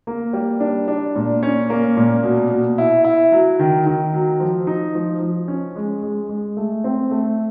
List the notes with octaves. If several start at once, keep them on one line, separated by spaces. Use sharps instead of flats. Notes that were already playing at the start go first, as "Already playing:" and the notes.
A#3
G3
D4
D4
A#2
C#4
A#3
A#2
B2
B2
E4
E4
F#3
D#3
D#3
F#3
F3
D#4
F3
F3
C#4
G#3
G#3
G#3
A3
C4
A3